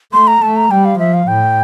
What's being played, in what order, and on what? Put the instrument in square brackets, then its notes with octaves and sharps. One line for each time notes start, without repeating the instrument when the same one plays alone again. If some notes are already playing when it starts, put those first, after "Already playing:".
[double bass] A3 [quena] C6
[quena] A#5
[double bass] A3 [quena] A5
[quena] A#5
[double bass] G3 [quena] G5
[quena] F5
[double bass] F3 [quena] E5
[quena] F5
[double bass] A2 [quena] G5